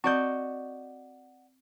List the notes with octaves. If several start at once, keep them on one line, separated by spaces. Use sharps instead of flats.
C4 F#4 D5 D#5 C#6 G6